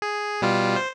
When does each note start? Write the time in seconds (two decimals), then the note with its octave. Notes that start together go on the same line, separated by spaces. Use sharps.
0.02 G#4
0.42 B2 G3 F4
0.76 C5